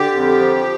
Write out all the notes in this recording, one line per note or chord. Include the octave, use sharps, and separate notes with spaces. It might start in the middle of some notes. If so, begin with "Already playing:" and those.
Already playing: D3 G4
F2
F3